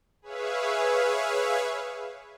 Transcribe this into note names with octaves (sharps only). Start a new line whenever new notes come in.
G#4 B4 C#5 E5 F5